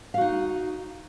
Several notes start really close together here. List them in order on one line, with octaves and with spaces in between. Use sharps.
F5 F#4 D#4